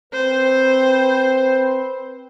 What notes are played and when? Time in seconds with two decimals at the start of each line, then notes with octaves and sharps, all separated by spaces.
0.13 C4 B4 C5